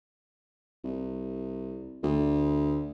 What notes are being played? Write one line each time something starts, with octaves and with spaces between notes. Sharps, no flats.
C2
D2